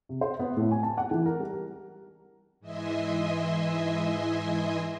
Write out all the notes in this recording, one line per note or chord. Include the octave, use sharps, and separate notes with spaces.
C3
C5
B3
A2
G#5
A5
F#5
E3
A#4
G3
G#2 E3 D#5 E5 G#5 C6